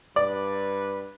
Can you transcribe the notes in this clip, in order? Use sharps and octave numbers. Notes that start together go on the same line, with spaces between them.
G2 B4 D5